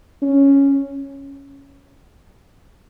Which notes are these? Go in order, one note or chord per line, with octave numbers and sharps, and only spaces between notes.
C#4